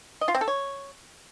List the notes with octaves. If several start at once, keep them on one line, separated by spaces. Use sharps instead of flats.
D#5
F4
C4
A4
C#5